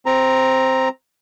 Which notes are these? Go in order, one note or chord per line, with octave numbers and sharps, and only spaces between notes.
C4 A#5